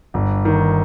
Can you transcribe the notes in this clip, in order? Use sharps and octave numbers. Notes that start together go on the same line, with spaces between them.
G1
D#3